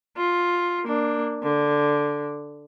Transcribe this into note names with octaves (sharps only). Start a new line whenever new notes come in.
F4
A#3 D4
D3